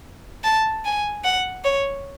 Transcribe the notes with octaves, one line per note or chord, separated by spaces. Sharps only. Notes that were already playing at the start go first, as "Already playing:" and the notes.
A5
G#5
F#5
C#5